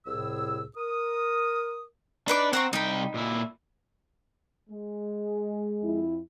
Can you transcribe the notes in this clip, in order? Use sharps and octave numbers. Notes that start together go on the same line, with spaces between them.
C2 A2 C3 G#4 E6
A#4 D#6
D4 D#4 B4 D6
C4 F#5 A#5 C#6
C2 D#4 G5 B5
A#2 E4
G#3
F2 E4